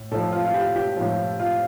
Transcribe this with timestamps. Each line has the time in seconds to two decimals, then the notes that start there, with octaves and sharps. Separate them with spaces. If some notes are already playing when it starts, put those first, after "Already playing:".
Already playing: A2
0.11 A2 F3 A4
0.32 F4
0.45 F4
0.54 G4
0.76 G4
0.97 A2 F3 F4
1.39 F4